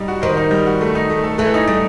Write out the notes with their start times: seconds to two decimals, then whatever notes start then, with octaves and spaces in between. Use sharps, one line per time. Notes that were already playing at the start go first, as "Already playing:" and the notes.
Already playing: G3 D#4
0.08 F#4
0.22 D#3 C5
0.37 D#4
0.51 G3
0.66 F#4
0.81 A3
0.95 D#4
1.10 A3
1.24 A4
1.38 E3 A3
1.54 D#4
1.68 G3 A3